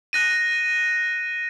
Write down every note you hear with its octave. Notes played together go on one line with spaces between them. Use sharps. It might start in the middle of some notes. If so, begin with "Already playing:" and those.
F#6 A#6 D#7